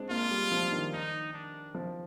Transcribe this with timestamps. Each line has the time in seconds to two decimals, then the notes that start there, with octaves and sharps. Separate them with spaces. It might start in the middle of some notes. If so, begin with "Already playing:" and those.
Already playing: G#3 C4 D4
0.10 A#3 F4
0.31 G3
0.52 F3
0.72 D#3
0.93 D#4
1.34 D4
1.75 F3